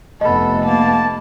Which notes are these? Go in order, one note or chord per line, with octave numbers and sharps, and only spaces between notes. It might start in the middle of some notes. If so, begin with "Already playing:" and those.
F1 B3 A4 D#5 B5
A#3 A5